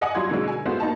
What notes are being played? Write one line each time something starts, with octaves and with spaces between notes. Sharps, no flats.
D5 D#5 F#5 G#5 D6 D#6
F#3 G3 F4 C6 G#6
B2 D3 F#3 G#3
G#5
G#3 A3 B3 F4 F#4 C5
A#3 D#4 A5